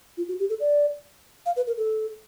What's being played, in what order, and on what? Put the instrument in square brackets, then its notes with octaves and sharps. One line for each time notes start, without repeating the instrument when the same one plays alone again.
[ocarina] F4
F#4
G4
A4
D5
F5
B4
A#4
A4